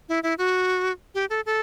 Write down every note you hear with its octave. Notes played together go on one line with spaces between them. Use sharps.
E4
E4
F#4
G4
A4
A4